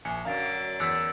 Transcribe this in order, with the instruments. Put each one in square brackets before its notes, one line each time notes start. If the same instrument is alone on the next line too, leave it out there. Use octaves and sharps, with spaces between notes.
[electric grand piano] A#1 G#5 C#7
[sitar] F#2 D3 F#3 [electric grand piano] F5 [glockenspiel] A#5 A6 D7
[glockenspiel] D7
[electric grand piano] E2 A6 B6 [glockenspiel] E6 F#6 C#7